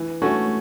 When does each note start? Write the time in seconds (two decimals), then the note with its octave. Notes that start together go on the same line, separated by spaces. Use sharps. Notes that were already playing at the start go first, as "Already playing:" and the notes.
Already playing: E3
0.22 A3 C#4 F#4